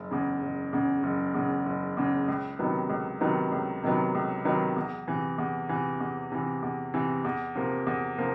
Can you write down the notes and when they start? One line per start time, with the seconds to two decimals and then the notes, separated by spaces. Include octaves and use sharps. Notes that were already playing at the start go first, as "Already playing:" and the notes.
Already playing: F#1
0.11 E2 C#3
0.41 F#1
0.73 E2 C#3
1.03 F#1
1.34 E2 C#3
1.66 F#1
1.97 E2 C#3
2.28 C#2
2.59 C3 D#3 F#3 B3
2.90 C#2
3.21 C3 D#3 F#3 B3
3.52 C#2
3.83 C3 D#3 F#3 B3
4.15 C#2
4.45 C3 D#3 F#3 B3
4.76 E2
5.08 C3 E3
5.38 E2
5.69 C3 E3
6.00 E2
6.32 C3 E3
6.63 E2
6.94 C3 E3
7.25 E2
7.55 C3 F3 A#3
7.87 E2
8.18 C3 F3 A#3